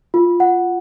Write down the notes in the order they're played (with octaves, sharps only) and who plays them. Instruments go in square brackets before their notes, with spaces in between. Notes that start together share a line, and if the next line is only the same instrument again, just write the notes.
[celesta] F4
F#5